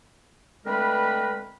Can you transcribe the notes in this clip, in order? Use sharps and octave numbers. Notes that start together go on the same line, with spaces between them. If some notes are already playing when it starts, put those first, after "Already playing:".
D3 G#3 A3 C4 A#4 B4